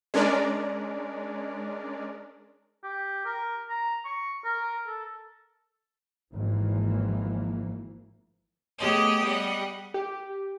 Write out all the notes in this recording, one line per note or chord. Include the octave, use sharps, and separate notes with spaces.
G#3 C#4 D4 A#4 D5
G4
A#4
A#5
C#6
A#4
A4
G#1 E3 F3 A#3
A3 B3 G4 G#4 C#5 D#5
G3 D#5 F#5
G4